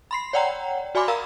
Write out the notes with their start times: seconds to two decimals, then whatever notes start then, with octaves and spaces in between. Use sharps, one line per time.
0.11 B5 C6 C7
0.33 C#5 D5 F#5 G5 A#5
0.95 F#4 D5 G#5 B5 C6 D6
1.08 A#4 F5 A#5 E6